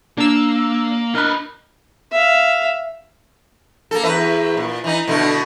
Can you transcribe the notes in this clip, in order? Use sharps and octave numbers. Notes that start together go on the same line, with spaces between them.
A#3 D4 E6
D4 A#4 B4 D#5
E5 F5
A#3 A4
E2 B4 E5
A#2
E3 D#4
B2 D3 A3